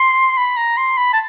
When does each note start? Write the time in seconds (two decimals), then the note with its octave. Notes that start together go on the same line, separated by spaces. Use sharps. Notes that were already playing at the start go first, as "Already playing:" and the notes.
Already playing: C6
0.37 B5
0.57 A#5
0.77 C6
0.97 B5
1.13 A5